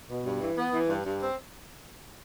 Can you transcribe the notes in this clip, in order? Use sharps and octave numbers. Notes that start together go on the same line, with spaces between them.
B2
G2
E3
B3
E3
G2
G2
C4